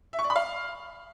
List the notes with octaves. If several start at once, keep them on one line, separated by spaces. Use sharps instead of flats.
E5
C#6
D5
B5
F5